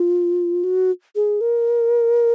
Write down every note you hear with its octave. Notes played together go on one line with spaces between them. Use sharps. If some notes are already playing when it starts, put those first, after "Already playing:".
Already playing: F4
F#4
G#4
A#4